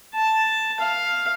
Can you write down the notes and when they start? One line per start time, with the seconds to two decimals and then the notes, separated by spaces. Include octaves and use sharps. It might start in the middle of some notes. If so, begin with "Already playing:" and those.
0.15 A5
0.80 F5